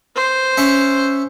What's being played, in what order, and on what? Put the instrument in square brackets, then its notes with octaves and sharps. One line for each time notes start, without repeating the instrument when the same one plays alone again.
[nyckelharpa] C5
[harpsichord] C#4 E5 C#6